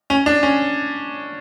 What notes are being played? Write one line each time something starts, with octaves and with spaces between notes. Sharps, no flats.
C#4
D4
C#4